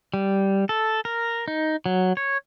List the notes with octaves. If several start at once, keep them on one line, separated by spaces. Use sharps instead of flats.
G3
A4
A#4
D#4
F#3
C#5